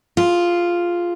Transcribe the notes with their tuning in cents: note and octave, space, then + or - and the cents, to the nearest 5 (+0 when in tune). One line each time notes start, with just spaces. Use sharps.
F4 +0 G#4 +15